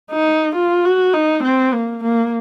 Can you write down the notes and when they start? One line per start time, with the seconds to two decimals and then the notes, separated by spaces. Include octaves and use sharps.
0.11 D#4
0.56 F4
0.85 F#4
1.14 D#4
1.44 C4
1.73 A#3
2.04 A#3